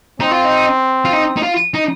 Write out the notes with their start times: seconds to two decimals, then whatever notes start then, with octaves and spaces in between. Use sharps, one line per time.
0.20 C4 D#4
0.32 F4
0.45 D#4
1.05 F4
1.13 D#4
1.37 D#4
1.43 F4
1.74 D#4